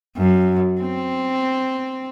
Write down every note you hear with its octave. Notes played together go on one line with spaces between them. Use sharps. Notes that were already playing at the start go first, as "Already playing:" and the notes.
F#2
C4